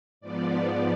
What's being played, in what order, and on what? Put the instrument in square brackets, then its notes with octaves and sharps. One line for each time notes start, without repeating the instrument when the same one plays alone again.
[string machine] G#2 F3 B3 D5